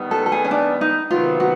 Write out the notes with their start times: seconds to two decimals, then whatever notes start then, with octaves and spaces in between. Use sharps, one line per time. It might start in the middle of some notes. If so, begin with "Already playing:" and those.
Already playing: D#3 G3 B3
0.11 A4
0.26 A4
0.32 G#4
0.45 C#4
0.51 D4
0.81 D#4
1.10 C3 D#3 F#3 B3 F4
1.40 F#4